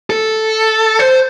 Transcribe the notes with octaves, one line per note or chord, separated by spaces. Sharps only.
A4
C5